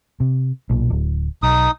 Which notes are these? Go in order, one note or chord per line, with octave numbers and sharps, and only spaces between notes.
C3
B1 A#2
D1
B1 D#4 D#6